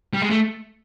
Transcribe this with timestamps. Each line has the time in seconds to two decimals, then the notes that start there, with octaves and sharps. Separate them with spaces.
0.13 G3
0.22 G#3
0.30 A3